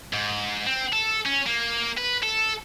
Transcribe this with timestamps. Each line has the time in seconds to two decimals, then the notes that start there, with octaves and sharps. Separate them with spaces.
0.13 G#2
0.66 C4
0.92 A4
1.26 C#4
1.47 A#3
1.98 B4
2.23 A4